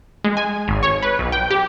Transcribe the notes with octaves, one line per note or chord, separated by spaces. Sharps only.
G#3
G#5
G#1
C#5
B4
B1
G5
G4